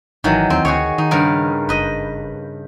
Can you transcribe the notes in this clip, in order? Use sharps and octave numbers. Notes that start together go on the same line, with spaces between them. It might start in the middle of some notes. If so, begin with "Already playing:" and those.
G#1 D#3 E3 F#3
D#2 C4
D2 F#4 G#4 C#5
D#3 D#4
G2 C#3 A#4
F#1 B4 D#5